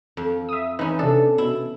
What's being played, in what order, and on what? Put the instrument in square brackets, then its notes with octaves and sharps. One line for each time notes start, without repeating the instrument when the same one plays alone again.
[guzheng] F2
[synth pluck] E5 D#6
[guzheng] E3 C#4 [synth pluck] D#4 B4
[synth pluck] C3 D4 [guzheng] A4
[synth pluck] B2 [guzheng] E4